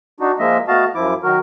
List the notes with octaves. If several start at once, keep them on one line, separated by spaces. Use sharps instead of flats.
D4 D#4 F#4
F3 G#3 A#3 D#5 E5
A3 B3 F#4 D#5 F5 A5
F#2 F3 E4 D6
D#3 F#3 F#4 A#4